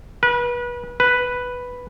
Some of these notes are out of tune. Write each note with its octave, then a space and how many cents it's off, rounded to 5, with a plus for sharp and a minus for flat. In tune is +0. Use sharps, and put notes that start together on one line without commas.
B4 -30
B4 +0